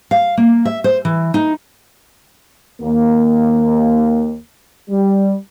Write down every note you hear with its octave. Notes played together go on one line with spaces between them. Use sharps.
F5
A#3
E5
C5
E3
D#4
D#2 A#3
G3